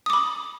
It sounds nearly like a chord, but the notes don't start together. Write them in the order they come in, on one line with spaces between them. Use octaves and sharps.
D#6 D6 B5